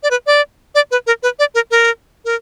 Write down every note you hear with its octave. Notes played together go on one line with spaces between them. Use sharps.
D5
B4
D5
D5
B4
A#4
B4
D5
A#4
A#4
A#4